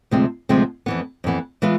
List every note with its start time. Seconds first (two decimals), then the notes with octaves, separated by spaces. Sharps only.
0.11 D2 C3 F3 G#3 C4
0.49 D2 C3 F3 G#3 C4
0.86 F2 E3 B3
1.24 F2 E3 B3
1.62 E3 G#3 B3 F4